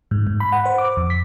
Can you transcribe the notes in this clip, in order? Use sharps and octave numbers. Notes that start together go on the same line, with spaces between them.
G#2
G#2
B5
F#5
C5
D6
F2
B6